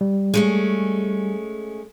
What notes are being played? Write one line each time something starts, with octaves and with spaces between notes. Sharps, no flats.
G3
G#3 A3 C#4